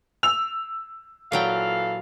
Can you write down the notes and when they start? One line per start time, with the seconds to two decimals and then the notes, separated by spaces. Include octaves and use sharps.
0.23 E6 F7
1.32 A#2 E3 F#3 A4 F5 G5